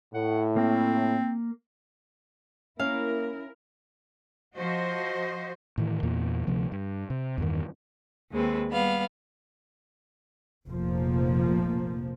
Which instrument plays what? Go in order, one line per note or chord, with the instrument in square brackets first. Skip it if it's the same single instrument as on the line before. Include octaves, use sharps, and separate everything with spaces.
[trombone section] A2 [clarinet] F#5
[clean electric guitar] A#3 [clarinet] C4
[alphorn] A#3 [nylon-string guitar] C#4 [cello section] E4 A#4 [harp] F5
[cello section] F3 F#4 C5 D#5
[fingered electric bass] A2 D#3 E3
E2 A#2 A#3
D2 C3 F3 B3
G2
C3
E2 G2 D#3
[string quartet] D#2 G#3 C4 B4
G3 B3 F5
[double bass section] F1 A#1 F3 A#3